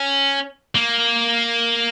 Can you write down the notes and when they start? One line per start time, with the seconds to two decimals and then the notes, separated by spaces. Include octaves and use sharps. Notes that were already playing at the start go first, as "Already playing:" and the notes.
Already playing: C#4
0.75 A#3